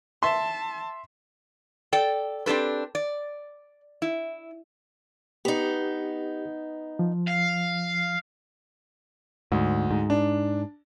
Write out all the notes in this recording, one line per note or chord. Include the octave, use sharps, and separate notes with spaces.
E5 A5 C6
A4 D5 G5
C4 D4 G4 A4 B4
D5
E4
B3 D#4 G4
F3
F5
D2 G#2
G#2
D4